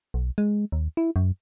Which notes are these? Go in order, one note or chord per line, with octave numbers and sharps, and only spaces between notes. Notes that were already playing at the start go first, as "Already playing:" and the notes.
B1
G#3
D#2
E4
F#2